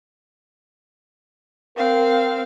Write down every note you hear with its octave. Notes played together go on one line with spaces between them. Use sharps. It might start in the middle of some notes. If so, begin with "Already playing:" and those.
C4 A#4 F5